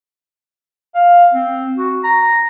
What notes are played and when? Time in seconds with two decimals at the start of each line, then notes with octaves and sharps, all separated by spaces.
0.95 F5
1.34 C4
1.78 F#4
2.04 A#5